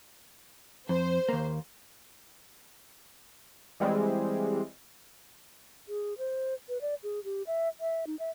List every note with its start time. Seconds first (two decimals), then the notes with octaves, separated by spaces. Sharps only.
0.89 F2 C5
1.29 D#2 A#3
3.80 E3 G3 G#3 C4
5.88 G#4
6.18 C5
6.69 B4
6.81 D5
7.03 G#4
7.24 G4
7.47 E5
7.81 E5
8.07 D#4
8.19 E5